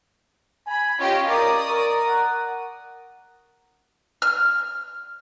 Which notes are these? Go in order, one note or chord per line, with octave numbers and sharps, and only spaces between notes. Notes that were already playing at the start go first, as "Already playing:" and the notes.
G#5 B5
C#4 F4 G4 D#5
A#4 D5 D6 D#6
A#4 C#6
F#5
F6